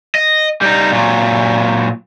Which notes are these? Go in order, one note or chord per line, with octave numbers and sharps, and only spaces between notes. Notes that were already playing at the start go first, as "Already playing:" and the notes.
D#5
G3 D#4
A#2 F#3